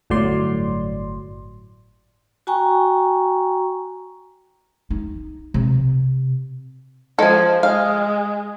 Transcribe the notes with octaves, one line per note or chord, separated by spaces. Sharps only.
G1 A2 F#3 D5 C6
F#4 G5 G#5 A#5 C#6
D#4
C3
F3 G#3 A4 G#5
G#3 F5